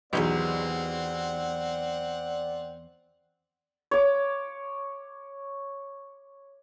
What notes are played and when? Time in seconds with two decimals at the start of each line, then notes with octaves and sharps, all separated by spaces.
0.13 B1 E2 C4 D#4 G4 D5 F#5
3.91 C#5 D6